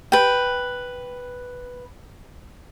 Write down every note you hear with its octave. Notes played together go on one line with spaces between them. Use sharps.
B4 G5